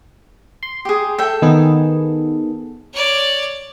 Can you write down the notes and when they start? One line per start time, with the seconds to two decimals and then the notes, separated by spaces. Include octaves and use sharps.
0.63 C6
0.85 G4 G#4
1.18 A4 E5 G5
1.42 D#3 B3 G#4
2.93 C#5 D5